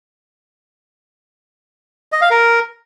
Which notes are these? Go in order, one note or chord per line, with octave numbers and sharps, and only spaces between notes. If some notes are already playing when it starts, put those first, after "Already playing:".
D#5
F5
A#4